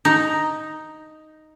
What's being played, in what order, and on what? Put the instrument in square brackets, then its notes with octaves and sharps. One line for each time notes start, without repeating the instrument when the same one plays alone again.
[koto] D#4